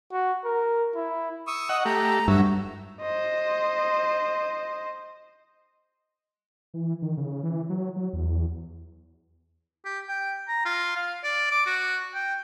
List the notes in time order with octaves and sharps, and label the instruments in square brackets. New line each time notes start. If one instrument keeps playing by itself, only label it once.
[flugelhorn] F#4
A#4
E4
[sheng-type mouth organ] C#6 D#6 E6
[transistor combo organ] D#5 F#5
[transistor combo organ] A3 G4 [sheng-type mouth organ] A#5
[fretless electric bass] G2 [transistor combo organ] F#3 E5 [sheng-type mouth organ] F#4
[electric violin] C5 D#5
[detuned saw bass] E3
D#3
C#3
E3
F#3
F#3
E2
[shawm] G4
G5
A#5
F4
F5
D5
D6
F#4
G5